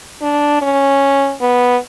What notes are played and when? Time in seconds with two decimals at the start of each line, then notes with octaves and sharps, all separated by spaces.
0.22 D4
0.62 C#4
1.41 B3